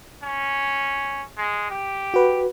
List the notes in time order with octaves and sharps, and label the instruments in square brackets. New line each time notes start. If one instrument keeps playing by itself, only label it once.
[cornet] C#4
G#3
G4
[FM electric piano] F#4 B4